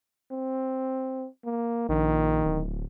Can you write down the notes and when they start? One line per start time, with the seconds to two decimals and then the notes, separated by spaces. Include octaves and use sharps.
0.32 C4
1.45 A#3
1.89 A#1 D#3
2.45 D1